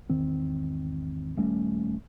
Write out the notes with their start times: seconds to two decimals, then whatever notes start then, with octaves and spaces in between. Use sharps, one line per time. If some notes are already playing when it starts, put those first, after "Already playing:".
0.10 G#1 E2 D#3 C4
1.36 D#1 G3 A3 C#4